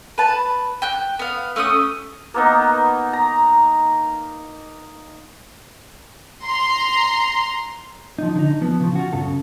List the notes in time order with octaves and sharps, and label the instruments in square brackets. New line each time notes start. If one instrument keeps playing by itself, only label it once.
[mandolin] B4 A5
G5 F#6
B3 F5
A3 C#4 C6 D#6
[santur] A#3 B3 D#4
A#5
[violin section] A#5 C6
[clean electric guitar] F3 D#4
D3 D#4
F3 B3
C#3 F3
F4 F#4
B1 F#2 C#3 A4